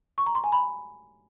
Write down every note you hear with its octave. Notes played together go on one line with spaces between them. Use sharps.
C#6
A#5
C6
G#5
B5